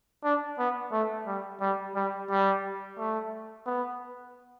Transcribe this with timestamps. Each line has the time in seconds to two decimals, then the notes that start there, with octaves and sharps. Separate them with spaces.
0.24 D4
0.59 B3
0.93 A3
1.27 G3
1.61 G3
1.96 G3
2.31 G3
2.98 A3
3.67 B3